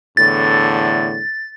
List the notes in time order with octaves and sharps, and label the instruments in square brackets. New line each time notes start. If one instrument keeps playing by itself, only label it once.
[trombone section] E2 A2 D3 [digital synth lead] A6